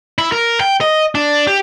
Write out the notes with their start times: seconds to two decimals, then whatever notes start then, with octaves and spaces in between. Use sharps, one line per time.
0.18 E4
0.32 A#4
0.61 G5
0.81 D#5
1.15 D4
1.47 G4